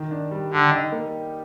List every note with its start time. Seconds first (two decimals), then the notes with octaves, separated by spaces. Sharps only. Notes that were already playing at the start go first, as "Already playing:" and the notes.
Already playing: D#3
0.11 D4
0.31 G3
0.51 D3 G4
0.71 D#4
0.92 A#3